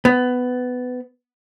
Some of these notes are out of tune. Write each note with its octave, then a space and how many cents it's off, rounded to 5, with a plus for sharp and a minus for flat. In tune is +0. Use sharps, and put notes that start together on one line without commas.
B3 +15